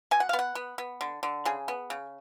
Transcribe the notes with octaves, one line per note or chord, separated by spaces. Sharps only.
B2 G#5
F#5
F5
B3
F#5
B3
B3
D3
D3
C#3 G#4
B3
C#3